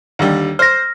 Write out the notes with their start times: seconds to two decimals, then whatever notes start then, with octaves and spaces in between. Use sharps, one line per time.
0.19 D#2 D3 G3
0.59 C5 F6 A#6